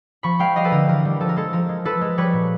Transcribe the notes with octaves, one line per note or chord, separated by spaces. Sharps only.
F3 B5 C#6
G#3 F5 G5
G3 D#5 F5
A4 B4
D3 A#4
E3 A#4
G3
F3 A4
A#4
G#3 A4
F3 A#4
G#3
F3 A4 B4
G#3
G3 B4 C#5
A#2